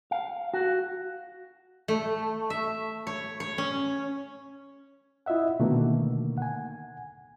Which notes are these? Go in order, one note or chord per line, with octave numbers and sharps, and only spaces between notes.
F5
F#4
A3
E5
C#5
C#5
C#4
E4 F4 D#5 E5 F#5
B2 D3 D#3 A3 A#3
F#5 G#5